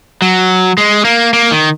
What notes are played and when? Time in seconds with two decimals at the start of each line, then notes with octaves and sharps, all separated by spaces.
0.22 F#3
0.78 G#3
1.05 A#3
1.33 A#3
1.52 D#3